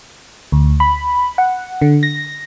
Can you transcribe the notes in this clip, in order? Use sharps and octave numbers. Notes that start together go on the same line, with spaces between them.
D2
B5
F#5
D3
A#6